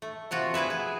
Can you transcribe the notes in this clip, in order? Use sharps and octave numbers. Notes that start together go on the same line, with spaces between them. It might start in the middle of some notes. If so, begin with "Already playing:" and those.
A3
C3 F3 F4 F#4
E4 G#4 B4 E5
G#4